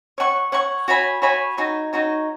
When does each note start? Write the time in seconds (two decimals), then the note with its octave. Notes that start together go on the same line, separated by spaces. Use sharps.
0.18 C#5 F#5 C#6
0.52 C#5 F#5 C#6
0.88 F#4 C#5 G#5 B5
1.22 F#4 C#5 G#5 B5
1.57 D#4 F#4 C#5
1.93 D#4 F#4 C#5